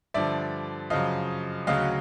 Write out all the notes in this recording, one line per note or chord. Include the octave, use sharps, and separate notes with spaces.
G2 D3 F3 D5 E5
F#2 C#3 F3 D#5 F5
D2 C#3 F#3 D#5 F5